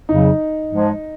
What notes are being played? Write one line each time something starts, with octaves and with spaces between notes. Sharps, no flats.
F2 C#3 F#3 D#4
G#2 F3 G#3